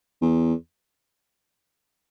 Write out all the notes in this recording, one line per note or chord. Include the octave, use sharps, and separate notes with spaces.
E2